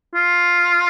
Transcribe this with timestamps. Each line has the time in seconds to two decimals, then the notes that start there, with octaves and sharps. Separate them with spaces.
0.15 F4